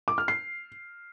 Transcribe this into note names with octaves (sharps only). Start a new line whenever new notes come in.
D6
F6
C7